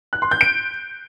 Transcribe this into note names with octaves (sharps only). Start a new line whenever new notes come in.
F#6
C6
G6
D7